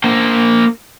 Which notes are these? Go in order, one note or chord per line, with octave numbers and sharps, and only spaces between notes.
A#3 C5